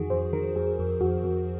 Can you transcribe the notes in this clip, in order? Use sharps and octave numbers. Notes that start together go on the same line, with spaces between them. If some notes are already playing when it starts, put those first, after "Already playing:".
Already playing: F2 D#3 F#4 G#4
F2 C5
D#3 A#4
F2 G#4
F2
F2 F#4
F2